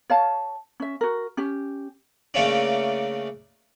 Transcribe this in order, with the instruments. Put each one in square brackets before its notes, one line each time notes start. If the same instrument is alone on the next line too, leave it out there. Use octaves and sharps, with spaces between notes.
[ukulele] C#5 F5 A5
C#4 E5
F#4 A#4
C#4 G4
[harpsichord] C#3 A3 A#3 C#4 D4